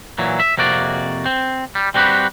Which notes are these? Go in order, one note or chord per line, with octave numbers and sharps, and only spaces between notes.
A#2 E3 F#3
E5
F2 C3 A#3 F#4 D5
C4
G3
G3 C4 F#4 G4 B4